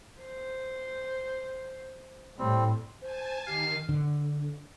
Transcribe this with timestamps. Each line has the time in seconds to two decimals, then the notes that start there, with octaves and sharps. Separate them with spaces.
0.21 C5
2.39 A2 G3 C4
3.02 C5 G#5 A5
3.47 D#3 G4 F5
3.89 D3